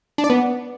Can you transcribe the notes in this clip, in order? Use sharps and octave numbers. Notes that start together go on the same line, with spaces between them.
D4
D5
B3